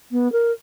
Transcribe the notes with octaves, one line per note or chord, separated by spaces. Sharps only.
B3
A#4